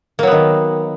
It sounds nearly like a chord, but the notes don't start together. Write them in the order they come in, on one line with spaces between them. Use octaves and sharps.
A#3 F#3 B3 D#3